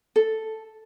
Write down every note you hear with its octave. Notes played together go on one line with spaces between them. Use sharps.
A4